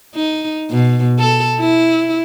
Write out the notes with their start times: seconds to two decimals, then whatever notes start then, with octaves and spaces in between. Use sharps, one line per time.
0.15 D#4
0.71 B2
1.19 A4
1.59 E4